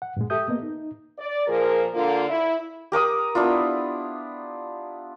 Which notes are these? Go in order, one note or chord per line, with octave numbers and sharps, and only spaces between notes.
F#5
G2 A#2 G#3
G4 A4 E5 D#6 G6
A#3 B3 D#5
D#4
D5
A#2 F3 G#4 A#4
D3 A#3 F4
E4
G4 A#4 D6 D#6
B3 D4 E4 F4